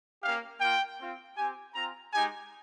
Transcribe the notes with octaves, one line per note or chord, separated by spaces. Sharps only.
A#3 C#4 G4 F5
A#3 F4 G5
C4 F4
C4 G4 G#5
C4 F4 A#5
G#3 D#4 G4 G#5